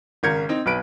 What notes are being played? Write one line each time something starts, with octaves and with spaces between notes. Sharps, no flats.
G#1 C#3 A#4 G6 G#6 C#7
C4 D#4
B1 B4 D7